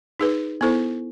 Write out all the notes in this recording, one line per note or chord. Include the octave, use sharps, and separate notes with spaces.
D#4 G#4 B4
B3 E4 A4 C5